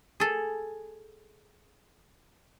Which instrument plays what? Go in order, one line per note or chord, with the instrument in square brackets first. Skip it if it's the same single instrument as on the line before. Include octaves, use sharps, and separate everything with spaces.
[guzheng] G#4 A4